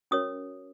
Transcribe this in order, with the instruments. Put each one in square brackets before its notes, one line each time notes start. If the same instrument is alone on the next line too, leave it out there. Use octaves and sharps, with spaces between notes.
[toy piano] C#4 F#4 A#4 C#5 D#6